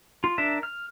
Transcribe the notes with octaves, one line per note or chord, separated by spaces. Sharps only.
F4
D4 A#4 E5
F6